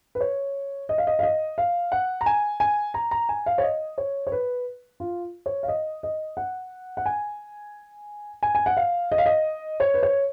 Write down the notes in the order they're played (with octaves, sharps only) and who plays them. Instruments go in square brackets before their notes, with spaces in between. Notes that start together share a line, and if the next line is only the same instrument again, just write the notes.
[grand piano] B4
C#5
D#5
F5
D#5
F5
D#5
F5
F#5
A#5
G#5
G#5
A#5
A#5
G#5
F5
C#5
D#5
C#5
C#5
B4
F4
C#5
F5
D#5
D#5
F#5
F#5
G#5
G#5
G#5
F#5
F5
D#5
F5
D#5
C#5
B4
C#5